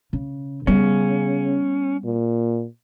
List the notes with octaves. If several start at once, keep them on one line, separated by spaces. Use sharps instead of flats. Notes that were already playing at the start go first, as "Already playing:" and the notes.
C#3
C#3 G3 B3 C#4
A#2